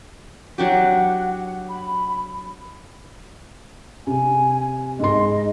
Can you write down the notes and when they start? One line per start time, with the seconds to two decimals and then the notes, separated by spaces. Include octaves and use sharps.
0.58 F#3 D4 G4 F#5
1.69 B5
4.07 C3 G#5
5.00 G#2 D#5 C6